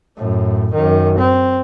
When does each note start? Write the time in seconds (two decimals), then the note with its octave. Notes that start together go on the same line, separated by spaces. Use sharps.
0.17 F#2 A2
0.74 F#2 D#3
1.18 C4